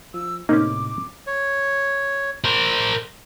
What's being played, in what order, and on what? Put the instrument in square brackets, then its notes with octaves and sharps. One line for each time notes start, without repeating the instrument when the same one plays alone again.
[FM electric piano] F3 [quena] E6
[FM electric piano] A2 C3 [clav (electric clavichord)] A#3 C4 C#4 [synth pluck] D#4 [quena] D6
[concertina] C#5
[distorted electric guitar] A#4 C5